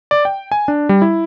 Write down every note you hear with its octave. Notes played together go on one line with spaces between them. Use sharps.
D5
G5
G#5
D4
G3
E4